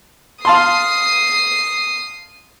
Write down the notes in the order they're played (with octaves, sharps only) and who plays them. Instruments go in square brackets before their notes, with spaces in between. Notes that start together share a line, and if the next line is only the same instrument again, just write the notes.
[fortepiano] F5 A5 C6 [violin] D#6 C7